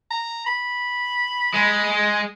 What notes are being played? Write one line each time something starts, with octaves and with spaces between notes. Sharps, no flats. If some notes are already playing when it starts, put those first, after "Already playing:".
A#5
B5
G#3